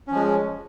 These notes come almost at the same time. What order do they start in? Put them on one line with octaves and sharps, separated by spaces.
C#4 F3 G#3